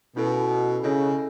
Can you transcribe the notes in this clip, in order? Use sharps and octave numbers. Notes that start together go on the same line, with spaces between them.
B2 C#4 E4 A4
C#3 C#4 E4 A4 D#5